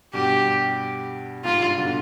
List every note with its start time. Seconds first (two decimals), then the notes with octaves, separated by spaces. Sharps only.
0.13 G2 B2 G4
1.44 G#2 C3 F4
1.61 G2
1.77 B2 D3